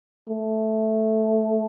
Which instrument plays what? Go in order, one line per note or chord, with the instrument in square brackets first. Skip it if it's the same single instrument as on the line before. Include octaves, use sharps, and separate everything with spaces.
[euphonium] A3